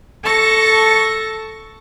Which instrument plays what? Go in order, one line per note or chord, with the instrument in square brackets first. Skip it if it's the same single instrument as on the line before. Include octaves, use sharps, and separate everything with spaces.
[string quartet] A4 A5 C#6 A#6